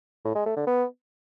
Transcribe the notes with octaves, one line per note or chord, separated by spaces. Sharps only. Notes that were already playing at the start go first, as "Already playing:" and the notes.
A2
G#3
A3
D3
B3